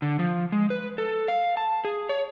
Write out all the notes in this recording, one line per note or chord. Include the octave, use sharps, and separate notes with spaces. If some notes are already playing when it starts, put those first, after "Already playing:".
D3
F3
G#3
B4
A4
F5
A5
G#4
C#5